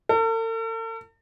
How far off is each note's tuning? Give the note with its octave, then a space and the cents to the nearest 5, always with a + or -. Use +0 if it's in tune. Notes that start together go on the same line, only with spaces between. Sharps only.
A4 +45